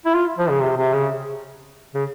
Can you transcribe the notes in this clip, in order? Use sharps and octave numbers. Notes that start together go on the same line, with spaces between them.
E4
F4
F3
C#3
C3
C3
C#3
C#3